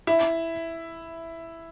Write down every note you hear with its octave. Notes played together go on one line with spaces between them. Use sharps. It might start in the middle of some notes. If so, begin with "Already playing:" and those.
E4